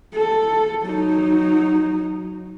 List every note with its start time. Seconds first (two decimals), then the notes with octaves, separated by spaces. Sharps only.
0.14 A4
0.83 F#3 D#4